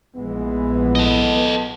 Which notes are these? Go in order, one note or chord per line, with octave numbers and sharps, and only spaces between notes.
A#1 E3 G#3 B3
A4 D#5